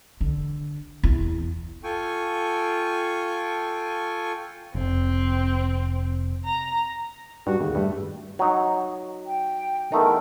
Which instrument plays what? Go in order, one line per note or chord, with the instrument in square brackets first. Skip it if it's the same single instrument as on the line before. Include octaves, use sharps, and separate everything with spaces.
[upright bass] D3
E2
[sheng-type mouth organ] F4 A4 G5 G#5 C#6
[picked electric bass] F1 [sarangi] C4
[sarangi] A#5
[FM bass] G2 [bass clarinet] F#4
[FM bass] D#2 [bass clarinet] C#3
[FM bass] G2 [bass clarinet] A3
[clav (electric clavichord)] F#3 D#4
[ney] G5
[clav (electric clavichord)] E2 A3 D#4 [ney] A#4